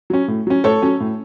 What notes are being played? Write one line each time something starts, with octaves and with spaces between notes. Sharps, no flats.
F#3 C#4
A2
F#3 C#4
A2 A4 C#5
F#3 C#4
A2